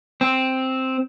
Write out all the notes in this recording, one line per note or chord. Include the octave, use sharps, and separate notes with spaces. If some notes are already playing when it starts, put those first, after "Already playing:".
C4